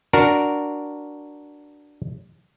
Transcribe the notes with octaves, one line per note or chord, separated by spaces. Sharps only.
D4 F#4 A#4